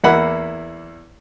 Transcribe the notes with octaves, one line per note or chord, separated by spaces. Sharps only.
E2 A#3 E4 F#5 B5